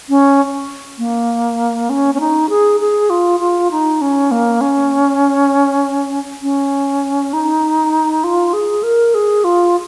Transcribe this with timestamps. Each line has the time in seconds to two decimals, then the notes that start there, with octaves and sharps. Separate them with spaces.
0.09 C#4
0.98 A#3
1.90 C#4
2.15 C#4
2.20 D#4
2.49 G#4
2.80 G#4
3.10 F4
3.40 F4
3.71 D#4
4.01 C#4
4.31 A#3
4.61 C#4
6.43 C#4
7.33 D#4
8.24 F4
8.53 G#4
8.83 A#4
9.14 G#4
9.44 F4